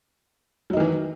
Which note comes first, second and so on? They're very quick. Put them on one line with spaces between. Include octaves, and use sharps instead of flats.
F#3 D#4 D#3 E3